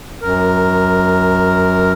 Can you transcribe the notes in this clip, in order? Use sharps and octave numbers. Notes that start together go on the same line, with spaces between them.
F#2 A#4